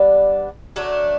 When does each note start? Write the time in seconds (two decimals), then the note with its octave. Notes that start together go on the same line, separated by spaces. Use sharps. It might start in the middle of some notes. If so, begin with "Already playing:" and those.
Already playing: G3 B3 D4
0.76 F#3 A3 D4